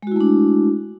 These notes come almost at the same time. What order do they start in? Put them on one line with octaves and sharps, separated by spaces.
G#3 F#4 E4 A3 D4